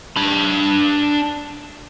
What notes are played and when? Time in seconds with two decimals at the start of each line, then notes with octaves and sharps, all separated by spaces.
0.16 D4 B5